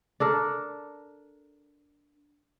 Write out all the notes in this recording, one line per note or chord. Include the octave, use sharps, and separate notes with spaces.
D4 A4 A#4